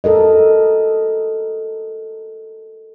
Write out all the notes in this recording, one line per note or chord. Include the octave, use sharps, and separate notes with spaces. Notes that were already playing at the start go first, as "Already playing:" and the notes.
F#4 A4 A#4 D#5